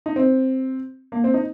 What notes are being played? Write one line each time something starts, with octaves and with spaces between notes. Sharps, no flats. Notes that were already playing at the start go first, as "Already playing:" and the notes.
D#4
C4
A#3
C4
D#4